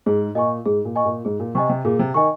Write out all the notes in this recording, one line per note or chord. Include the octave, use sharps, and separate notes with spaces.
G#2 G#4
A#2 D#5 G#5 C#6
G#2 G#4
A#2
D#5 G#5 C#6
A#2
G#2 G#4
A#2
C3 D#5 G#5 C#6
C3
A#2 G#4
C3
D#3 D#5 G#5 C#6